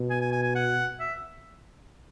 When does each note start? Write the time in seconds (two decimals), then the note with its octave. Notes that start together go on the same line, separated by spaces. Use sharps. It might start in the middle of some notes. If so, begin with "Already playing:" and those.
Already playing: B2
0.10 G#5
0.21 G#5
0.32 G#5
0.43 G#5
0.55 F#5
1.00 E5